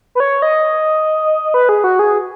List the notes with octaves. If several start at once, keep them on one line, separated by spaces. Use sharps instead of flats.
B4
C#5
D#5
B4
G#4
F#4
G#4